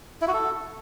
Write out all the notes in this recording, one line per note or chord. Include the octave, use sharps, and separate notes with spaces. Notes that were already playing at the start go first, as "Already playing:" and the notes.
E4
F#4
A4